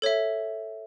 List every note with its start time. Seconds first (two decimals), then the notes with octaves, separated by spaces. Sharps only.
0.02 A4 C#5 E5